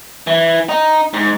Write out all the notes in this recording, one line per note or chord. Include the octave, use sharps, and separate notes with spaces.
E3
D#4
G#2